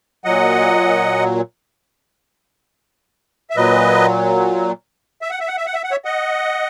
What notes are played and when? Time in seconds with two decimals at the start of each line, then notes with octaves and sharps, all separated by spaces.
0.24 A#2 F#3 D#5 F#5
3.50 E5
3.56 A#2 F#3 B4 D#5
5.22 E5
5.30 F#5
5.40 E5
5.48 F#5
5.57 E5
5.66 F#5
5.74 E5
5.84 F#5
5.91 C#5 E5
6.05 D#5 F#5